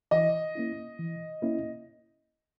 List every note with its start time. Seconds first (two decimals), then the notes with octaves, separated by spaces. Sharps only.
0.11 E3 D#5
0.55 A#3 C#4 E4
0.99 E3
1.42 A#3 C#4 E4